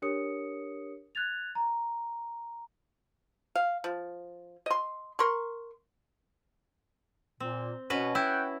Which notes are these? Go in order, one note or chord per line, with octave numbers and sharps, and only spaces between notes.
D4 G4 A#4 C#5 D#6 C#7
F#6 G#6 A6 F7
A#5
F5
F3
D#5 C6
A#4 C6 C#6
A#2 C4
B2 C#4 F#4 B4
E4 F#5 G5